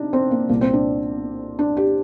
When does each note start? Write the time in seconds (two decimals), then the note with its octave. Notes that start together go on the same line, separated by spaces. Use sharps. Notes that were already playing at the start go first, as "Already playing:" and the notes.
Already playing: C3 D4 D#4
0.13 C4
0.31 A#3
0.49 C2 A#2 A#3
0.61 C4
0.73 D4
1.59 D4
1.77 G4